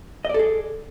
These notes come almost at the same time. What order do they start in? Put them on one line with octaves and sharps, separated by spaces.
D#5 D5 A4 G#4